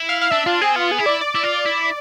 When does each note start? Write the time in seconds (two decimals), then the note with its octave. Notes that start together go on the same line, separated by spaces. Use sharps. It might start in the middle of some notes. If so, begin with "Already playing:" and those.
Already playing: E4
0.09 F5
0.21 F5
0.31 D4 E5
0.46 D4 F4
0.62 C4 G#4
0.76 B3 F4
0.91 G#4
0.99 E4
1.06 D5
1.21 D5
1.35 E4
1.43 F4
1.65 E4